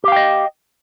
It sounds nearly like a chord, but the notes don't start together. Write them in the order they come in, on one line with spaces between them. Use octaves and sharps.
G4 F5 G5 D#5